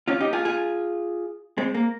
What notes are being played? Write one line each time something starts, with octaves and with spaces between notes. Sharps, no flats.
C#4 F4
D#4 G4
F4 G#4
F4 G#4
G#3 C4
A#3